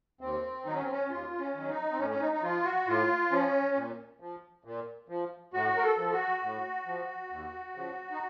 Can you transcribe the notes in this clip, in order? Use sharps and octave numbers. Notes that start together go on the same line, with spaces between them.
D#2 C4
D#3 F#3 D#4
C#4
C4
C#4
D#2 F4
C#4
D#3 F#3
D#4
C4
A2 C#4
C#4
D#4
D#4
F3 F4
F#4
A2 F4
F3 C#4
A#2
F3
A#2
F3
A2 F#4
A#4
A4
F3
F#4
A2
F3
D#2
C#3 F3
D#4